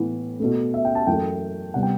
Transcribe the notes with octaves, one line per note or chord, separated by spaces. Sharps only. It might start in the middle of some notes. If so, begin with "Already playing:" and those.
Already playing: A2 E3 B3
B2 A3
E5
G5
A5
F#2 E3 A3 G5
C3 G3 B3 F#5
G5